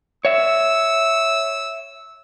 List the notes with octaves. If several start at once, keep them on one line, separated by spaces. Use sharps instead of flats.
C#5 E5 E6